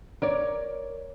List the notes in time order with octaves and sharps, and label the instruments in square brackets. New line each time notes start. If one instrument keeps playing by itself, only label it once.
[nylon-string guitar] A#4 C#5 D5